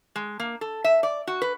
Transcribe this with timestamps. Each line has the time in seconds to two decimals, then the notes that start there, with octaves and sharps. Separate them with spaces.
0.16 G#3
0.40 A#3
0.61 A4
0.84 E5
1.03 D5
1.27 F#4
1.42 B4